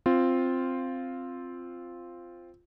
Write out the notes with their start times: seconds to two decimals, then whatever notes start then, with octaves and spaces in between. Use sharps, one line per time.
0.06 C4 F4